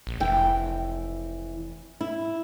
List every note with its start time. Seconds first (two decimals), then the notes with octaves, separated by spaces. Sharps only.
0.07 A#1
0.20 F1 E3 G5
2.01 E4